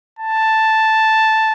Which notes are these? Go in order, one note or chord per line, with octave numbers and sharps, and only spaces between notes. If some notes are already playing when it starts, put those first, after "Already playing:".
A5